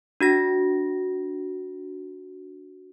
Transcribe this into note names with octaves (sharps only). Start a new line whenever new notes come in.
D4 F#4 A#6